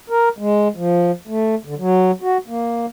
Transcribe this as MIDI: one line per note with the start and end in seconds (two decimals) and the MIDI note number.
0.10 0.29 70
0.38 0.68 56
0.76 1.12 53
1.27 1.55 57
1.65 1.75 50
1.78 2.11 54
2.22 2.38 66
2.48 2.86 58